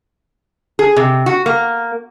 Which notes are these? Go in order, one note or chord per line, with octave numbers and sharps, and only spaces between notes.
G#4
C3
F#4
A#3